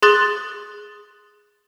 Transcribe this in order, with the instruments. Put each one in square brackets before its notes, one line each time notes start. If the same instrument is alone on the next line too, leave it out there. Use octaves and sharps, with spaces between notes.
[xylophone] G#4 C6 D#6 F#6 A6 G7